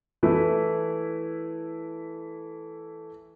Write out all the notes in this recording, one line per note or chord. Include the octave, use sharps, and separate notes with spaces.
E3 A3 E4 B4